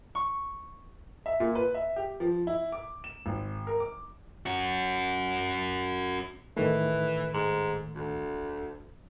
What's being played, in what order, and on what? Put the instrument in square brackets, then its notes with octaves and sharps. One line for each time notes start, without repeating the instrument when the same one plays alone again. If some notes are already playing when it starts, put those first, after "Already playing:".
[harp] C#6
[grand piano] E5
A#2
B4
E5
G4
F3
E4
D6
E7
G#1
A#4
D6
[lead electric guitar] C#4 F#4
[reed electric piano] A2 D#3 A3 [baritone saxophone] E3
[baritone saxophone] G#2
D2